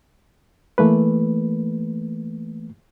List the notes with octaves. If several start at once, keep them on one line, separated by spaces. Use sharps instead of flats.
E3 A3 A#3 B4